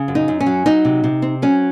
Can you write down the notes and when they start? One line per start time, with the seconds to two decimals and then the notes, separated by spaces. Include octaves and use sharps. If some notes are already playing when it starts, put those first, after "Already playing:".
Already playing: C#3
0.08 F#2
0.15 D#4
0.28 F#2
0.40 C#4
0.46 F#3
0.66 F#3 D#4
0.85 C3
1.04 C3
1.22 C4
1.42 F#3 C#4